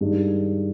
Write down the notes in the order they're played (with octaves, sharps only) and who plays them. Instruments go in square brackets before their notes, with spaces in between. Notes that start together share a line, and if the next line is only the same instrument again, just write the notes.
[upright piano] G2 D#3 G#3